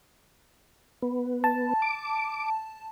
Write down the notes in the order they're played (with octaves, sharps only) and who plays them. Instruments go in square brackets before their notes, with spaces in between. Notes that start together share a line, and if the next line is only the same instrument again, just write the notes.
[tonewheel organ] B3
[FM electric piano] A5
[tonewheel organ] D6